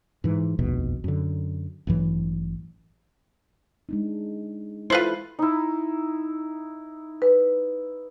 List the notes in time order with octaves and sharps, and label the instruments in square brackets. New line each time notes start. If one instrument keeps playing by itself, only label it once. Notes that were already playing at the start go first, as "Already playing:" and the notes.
[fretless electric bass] G#2 E3
F1 A#1 D#2 B2
F#2 D3
A1 G2 E3 F#3
[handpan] G#3 D4 D#4
[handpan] E4 A4 [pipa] F4 B4 C5
[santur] D#4 E4
[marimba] B4